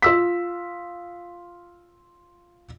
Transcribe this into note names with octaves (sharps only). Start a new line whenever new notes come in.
F4 E6 B6